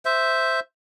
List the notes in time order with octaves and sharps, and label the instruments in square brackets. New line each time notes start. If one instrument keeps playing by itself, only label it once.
[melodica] C5 E5